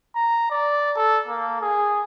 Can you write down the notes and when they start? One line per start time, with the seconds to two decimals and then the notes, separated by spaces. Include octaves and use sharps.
0.16 A#5
0.51 D5
0.96 A4
1.27 A#3
1.61 G#4